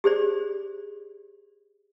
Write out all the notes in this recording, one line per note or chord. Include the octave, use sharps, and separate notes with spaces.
G4 G#4 C5 D5